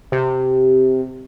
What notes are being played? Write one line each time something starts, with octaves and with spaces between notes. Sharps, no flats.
C3